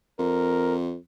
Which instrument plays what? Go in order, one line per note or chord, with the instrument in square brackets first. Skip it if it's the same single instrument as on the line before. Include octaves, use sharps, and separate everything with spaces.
[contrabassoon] F2 [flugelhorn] A#4